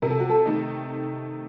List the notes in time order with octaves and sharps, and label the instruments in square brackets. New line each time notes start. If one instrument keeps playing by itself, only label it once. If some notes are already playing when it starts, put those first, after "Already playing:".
[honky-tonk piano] C3 [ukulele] A#4
[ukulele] A4
F#4
A4
[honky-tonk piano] D#3 A3 D#4